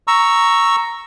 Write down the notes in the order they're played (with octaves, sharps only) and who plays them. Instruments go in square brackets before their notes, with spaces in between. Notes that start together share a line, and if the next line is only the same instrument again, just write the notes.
[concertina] A#5 C#6 E6